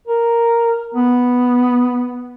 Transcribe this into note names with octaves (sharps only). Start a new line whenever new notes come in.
A#4
B3